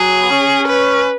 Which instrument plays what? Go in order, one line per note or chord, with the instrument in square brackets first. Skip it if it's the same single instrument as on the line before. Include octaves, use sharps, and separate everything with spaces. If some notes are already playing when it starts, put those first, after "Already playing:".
Already playing: [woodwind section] F#3 [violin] G#4
[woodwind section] B3
C#4
[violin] B4